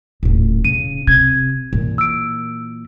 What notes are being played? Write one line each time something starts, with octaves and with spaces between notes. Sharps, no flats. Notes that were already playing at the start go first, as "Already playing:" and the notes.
D#1 A2
C#3 D#7
C3 G#6
A#2 E3
E6 D7